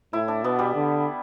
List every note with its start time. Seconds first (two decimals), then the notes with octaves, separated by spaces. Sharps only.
0.13 A2 E4
0.28 D4
0.43 B2 B3
0.59 G3
0.75 D3